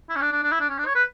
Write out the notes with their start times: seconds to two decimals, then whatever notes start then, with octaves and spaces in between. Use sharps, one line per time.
0.09 E4
0.16 C#4
0.21 D4
0.32 D4
0.43 D4
0.51 E4
0.60 D4
0.69 C#4
0.78 D4
0.86 C#5
0.95 B4